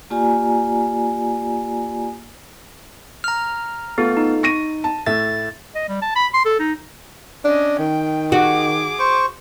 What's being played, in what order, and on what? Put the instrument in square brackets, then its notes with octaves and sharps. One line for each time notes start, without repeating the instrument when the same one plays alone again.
[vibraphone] A#3 F4 G4 D5 G#5 A#5
[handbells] A#5 F6
[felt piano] A3 F4 [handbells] B3
[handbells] D#4
[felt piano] C#6 A#6 D#7
A5
[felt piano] A2 E5 [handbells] A6
[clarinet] D#5
G3
A5
B5
C6
A4
D#4
[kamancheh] C#4 D#5 [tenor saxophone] D4
[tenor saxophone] D#3 [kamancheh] G5
[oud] F#4 [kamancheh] G#4 D6
[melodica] C5 C#6